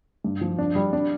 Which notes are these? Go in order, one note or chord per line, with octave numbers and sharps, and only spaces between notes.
G2
F3
D4
G3
D4